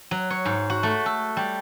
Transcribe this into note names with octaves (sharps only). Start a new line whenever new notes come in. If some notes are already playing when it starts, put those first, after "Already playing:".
F#3
C#5
G#2
F#4
A3
A4
G3